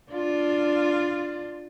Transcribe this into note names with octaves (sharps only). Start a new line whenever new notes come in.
D4 F4